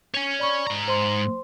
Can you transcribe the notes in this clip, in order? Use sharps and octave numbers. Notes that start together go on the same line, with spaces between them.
C#5 G#5
D5 B5 C#6
G#2 A#5
C5 C6